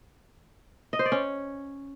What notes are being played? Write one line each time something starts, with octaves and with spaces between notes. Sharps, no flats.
D#5
C5
D5
C#4